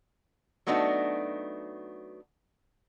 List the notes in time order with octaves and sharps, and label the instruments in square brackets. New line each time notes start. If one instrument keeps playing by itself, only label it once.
[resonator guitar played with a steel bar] F#3 A3 B3 D4 D#4 F#4